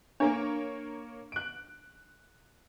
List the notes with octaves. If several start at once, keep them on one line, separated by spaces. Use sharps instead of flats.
A#3 D4 A#4 C#5
F#6 D7